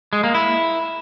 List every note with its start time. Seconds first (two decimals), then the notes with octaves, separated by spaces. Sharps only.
0.13 G#3
0.24 A#3
0.35 E4